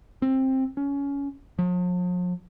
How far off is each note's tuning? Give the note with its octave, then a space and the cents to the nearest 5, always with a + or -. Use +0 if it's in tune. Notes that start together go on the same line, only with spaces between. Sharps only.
C4 +15
C#4 +20
F3 +45